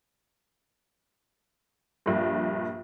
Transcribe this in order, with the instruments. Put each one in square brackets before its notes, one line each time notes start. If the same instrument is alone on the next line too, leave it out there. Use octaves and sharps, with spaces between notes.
[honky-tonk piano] A#1 G2